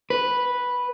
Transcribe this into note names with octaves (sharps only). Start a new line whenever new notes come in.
B4